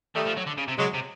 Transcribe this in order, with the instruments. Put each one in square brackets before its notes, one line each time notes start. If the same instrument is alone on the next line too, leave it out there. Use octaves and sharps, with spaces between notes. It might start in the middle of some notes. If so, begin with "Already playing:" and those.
[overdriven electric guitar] D#3 [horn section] G3 A3
[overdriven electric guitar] F3
F#3
D3
C#3
C3
[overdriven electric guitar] C#3 [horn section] F#3 G#3
[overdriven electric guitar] C3